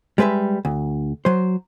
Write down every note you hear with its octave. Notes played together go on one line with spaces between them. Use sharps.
G3 G#3 B4 C5 E5
D2
F#3 C5